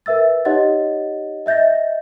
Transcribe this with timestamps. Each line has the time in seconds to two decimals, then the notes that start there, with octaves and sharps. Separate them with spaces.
0.06 A#4 B4 E5 E6 A6
0.45 D#4 G4 C#5 D#5 F#5 A6
1.46 D#5 E5 G6 A6 A#6